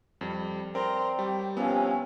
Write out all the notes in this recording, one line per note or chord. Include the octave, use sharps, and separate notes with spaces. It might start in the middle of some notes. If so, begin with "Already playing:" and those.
F2 G3
C4 A#4 D5 A#5 C6
G3 G4 C#5
C3 F3 B3 C#4 A4 F5